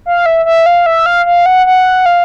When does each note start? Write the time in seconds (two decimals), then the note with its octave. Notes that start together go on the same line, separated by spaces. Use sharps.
0.06 F5
0.26 E5
0.45 E5
0.66 F5
0.86 E5
1.06 F5
1.26 F5
1.46 F#5
1.66 F#5
2.06 F5